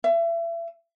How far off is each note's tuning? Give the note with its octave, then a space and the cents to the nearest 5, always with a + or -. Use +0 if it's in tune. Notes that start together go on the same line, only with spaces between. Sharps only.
E5 +35